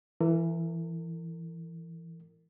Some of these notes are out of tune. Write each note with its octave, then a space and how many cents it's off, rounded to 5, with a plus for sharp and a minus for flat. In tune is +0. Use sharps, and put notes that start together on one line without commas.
E3 +10 A#4 -40